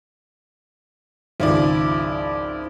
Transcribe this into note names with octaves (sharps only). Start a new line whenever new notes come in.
G#1 C#2 F3 E4 D5